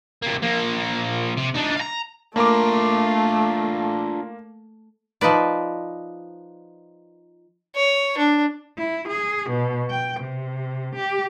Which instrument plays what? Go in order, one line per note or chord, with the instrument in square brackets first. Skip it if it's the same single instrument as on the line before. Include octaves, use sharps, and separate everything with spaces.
[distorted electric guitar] C3 A#3
F3 A#3
C3
D4 D#4
F5 A#5
[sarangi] A3 [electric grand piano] A#3 A#4 D6 [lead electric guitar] D4 F4
[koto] F3 D#4 B4 D5
[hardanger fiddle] C#5
D4
[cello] E4
G#4
B2
G5
C3
G4